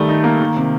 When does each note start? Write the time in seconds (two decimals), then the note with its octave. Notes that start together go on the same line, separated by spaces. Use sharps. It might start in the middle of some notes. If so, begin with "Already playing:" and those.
Already playing: D#3 G3 A3
0.09 D#4
0.24 A#3
0.41 D#3
0.56 C3